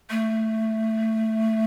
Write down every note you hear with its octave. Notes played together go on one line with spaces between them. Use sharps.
A3